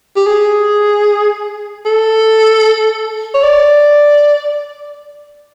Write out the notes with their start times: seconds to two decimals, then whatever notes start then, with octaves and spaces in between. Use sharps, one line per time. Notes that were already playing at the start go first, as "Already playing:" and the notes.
0.16 G4
0.27 G#4
1.86 A4
3.34 C#5
3.43 D5